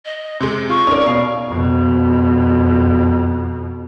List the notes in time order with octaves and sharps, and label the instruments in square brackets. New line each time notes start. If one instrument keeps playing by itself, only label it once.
[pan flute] D#5
[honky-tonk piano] C3 G#3 [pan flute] C6
[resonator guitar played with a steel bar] F4 [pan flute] C#6
[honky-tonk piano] C#4 A#4 [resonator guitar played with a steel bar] D#4 D5
[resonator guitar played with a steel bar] B2 F5
[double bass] F2 B2